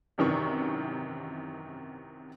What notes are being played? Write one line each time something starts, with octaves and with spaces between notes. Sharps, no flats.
G#1 F#2 C3 D#3 E3 C#6